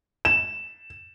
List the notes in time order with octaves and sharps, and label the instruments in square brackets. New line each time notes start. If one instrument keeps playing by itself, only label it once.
[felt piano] E7